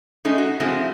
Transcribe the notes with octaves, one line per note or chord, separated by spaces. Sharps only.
G#3 A3 C#4 D#4
F#4
F3 G#3 A3 C4 E4 F#4